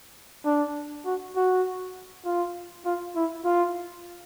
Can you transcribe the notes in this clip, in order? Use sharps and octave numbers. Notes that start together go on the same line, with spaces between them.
D4
F#4
F#4
F4
F4
E4
F4